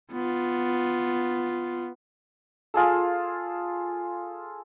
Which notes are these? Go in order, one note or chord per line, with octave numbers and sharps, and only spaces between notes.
B3 F4
F4 G#4 A4